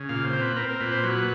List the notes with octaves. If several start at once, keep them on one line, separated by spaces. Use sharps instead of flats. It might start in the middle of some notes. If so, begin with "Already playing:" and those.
Already playing: C#3
A#2 F5
C5
C4
B4
C4 A#4
A#4
A#2 B4
C5
F#3 B4